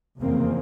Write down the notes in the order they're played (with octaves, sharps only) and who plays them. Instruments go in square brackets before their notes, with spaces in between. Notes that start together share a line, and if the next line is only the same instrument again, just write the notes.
[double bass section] F1 E2 C#3 A#3 C4